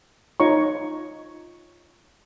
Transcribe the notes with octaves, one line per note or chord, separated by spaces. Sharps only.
D#4 F4 C#5 A#5 C#6